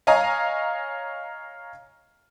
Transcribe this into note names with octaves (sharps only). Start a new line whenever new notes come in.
C#5 D#5 F5 G#5 A#5